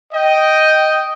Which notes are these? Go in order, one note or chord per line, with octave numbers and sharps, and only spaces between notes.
D#5 G5